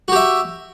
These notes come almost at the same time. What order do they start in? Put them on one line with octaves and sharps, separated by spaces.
F#4 G4 E5